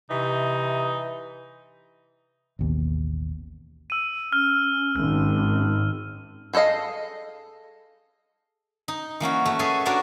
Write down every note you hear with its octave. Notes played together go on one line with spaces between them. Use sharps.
C3 E3 D#4
A1 D#2 B2
E6 D#7
C#4 F6
G#1 F6
G#4 A4 C5 D#5 F5
D#4
E3 A#3 C#4 F#4
A3 F#4
G#4 A4 B4 C#5 E5 G#5
D4 F#4 A#4 C#5 D5 E5